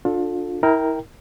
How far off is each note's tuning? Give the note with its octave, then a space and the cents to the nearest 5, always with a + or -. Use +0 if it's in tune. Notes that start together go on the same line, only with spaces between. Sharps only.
D4 +0 F4 +30 A4 +0
E4 -35 A#4 +0 G5 +0